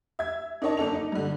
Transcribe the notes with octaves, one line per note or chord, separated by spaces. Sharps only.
E5 G#6
D4 D#4 A#4 C#5 D#5 A5
F#1 D4 A4 F7
D#4
G2 D3